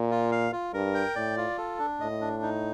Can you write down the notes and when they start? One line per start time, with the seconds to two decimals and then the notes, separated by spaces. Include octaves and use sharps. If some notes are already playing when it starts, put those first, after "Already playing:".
Already playing: A#2
0.11 F4
0.32 F5
0.52 F4
0.74 G2 A#4
0.94 G5
1.16 A2 D5
1.37 F4
1.58 A4
1.79 D4
2.00 A2 D#5
2.21 D4
2.43 D#4